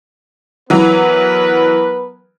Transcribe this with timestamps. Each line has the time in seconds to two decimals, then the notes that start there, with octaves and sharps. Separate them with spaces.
0.70 E3 F#3 B3 A#4 B4